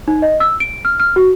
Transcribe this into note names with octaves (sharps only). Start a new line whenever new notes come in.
D#4
D#5
E6
D7
F6
F6
F#4